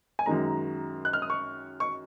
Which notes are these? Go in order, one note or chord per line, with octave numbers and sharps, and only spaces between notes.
G#5
F#2 D#3 G#3 A#5
F#6
F6
D#6
C#6
C#6